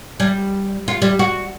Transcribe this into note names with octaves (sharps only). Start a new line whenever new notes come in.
G3
F4
G3
F#4